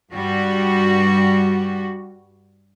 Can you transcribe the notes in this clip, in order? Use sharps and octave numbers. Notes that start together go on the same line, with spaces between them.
G2 G3 F#4